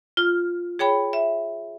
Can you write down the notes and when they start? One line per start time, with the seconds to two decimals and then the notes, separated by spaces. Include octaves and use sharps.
0.17 F4 F6
0.79 G#4 C#5 G5 B5
1.13 E5